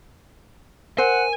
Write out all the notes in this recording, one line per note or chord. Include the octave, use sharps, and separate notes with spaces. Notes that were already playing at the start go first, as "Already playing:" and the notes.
A#4 C5 F#5 G#5